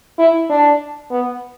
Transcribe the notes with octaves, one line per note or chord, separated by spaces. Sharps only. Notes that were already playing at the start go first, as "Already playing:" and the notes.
E4
D4
B3